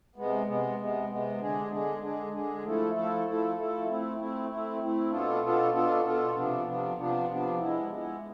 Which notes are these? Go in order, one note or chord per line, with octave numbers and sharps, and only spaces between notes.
C3 G#3 B3
C3 G#3 B3
C3 G#3 B3
C3 G#3 B3
D3 G#3 D4 G#4
D3 G#3 D4 G#4
D3 G#3 D4 G#4
D3 G#3 D4 G#4
F3 A3 E4 A4
F3 A3 E4 A4
F3 A3 E4 A4
F3 A3 E4 A4
A3 C4 E4
A3 C4 E4
A3 C4 E4
A3 C4 E4
B2 B3 D4 F4 A4
B2 B3 D4 F4 A4
B2 B3 D4 F4 A4
B2 B3 D4 F4 A4
C3 F3 B3 D4
C3 F3 B3 D4
C3 F3 B3 D4
C3 F3 B3 D4
G#3 B3 E4
G#3 B3 E4